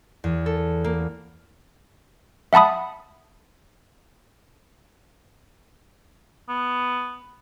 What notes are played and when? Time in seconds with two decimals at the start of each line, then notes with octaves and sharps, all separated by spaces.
0.24 E2
0.46 A4
0.84 A#3
2.53 E5 F#5 A5 B5 D#6
6.49 B3